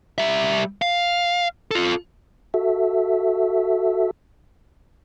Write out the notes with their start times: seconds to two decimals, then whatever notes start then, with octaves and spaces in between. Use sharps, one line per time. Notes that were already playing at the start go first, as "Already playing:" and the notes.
0.18 G3 E5
0.82 F5
1.71 F4 A4
2.54 F#4 A4 E5